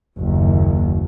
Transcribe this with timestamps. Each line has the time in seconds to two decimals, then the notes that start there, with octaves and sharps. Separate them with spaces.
0.17 F#1 D#2